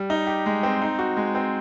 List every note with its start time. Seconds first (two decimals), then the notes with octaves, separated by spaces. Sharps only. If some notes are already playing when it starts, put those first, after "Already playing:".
Already playing: G3
0.10 D#4
0.27 G4
0.46 G#3
0.63 C4
0.82 D#4
0.99 F#4
1.17 G#3
1.35 C4